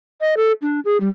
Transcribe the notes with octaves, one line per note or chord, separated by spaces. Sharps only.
D#5
A4
D4
G#4
G3